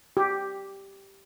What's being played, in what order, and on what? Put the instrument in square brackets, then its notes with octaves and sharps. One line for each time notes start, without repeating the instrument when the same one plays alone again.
[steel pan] G4